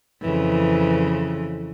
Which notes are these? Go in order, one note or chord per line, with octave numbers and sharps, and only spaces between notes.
F2 C#3 E3